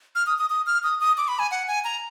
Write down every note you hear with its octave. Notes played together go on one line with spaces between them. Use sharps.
F6
D#6
D#6
D#6
F6
D#6
D#6
D6
B5
G#5
F#5
G#5
A#5